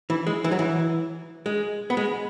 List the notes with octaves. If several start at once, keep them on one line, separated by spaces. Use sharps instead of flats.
E3
G#3
E3
F#3
E3
G#3
B3
G#3